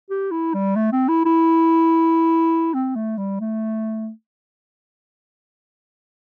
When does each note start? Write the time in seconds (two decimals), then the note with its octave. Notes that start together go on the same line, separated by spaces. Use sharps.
0.10 G4
0.31 E4
0.54 G3
0.76 A3
0.92 C4
1.08 E4
1.26 E4
2.74 C4
2.96 A3
3.17 G3
3.40 A3